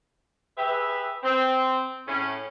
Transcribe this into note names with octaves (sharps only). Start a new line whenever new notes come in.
G4 G#4 B4 E5
C4
A2 C#4